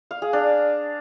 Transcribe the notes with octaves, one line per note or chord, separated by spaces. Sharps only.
F5
G#4
D4